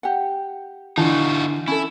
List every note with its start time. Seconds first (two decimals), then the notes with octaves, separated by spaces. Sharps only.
0.03 G4 F#5
0.97 D3 E3 D#4 F4 F#4 A5
1.68 C#4 E4 A4